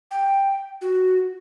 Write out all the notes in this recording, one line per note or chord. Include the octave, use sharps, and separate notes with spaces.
G5
F#4